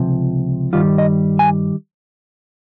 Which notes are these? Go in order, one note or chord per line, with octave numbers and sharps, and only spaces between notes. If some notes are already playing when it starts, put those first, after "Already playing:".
Already playing: C#2 C3 F3
G2 D#3 G3 F4
D#5
G#5